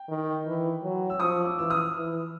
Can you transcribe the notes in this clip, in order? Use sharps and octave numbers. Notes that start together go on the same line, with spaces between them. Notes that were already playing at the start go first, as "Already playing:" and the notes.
Already playing: G5
D#3
E3
F#3
E6
F3 C#6 D#6
D6 E6
E3 E6
D#6 F6
E3